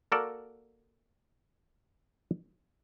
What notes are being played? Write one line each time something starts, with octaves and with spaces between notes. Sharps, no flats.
A#3 F#4 A4 A#4 D5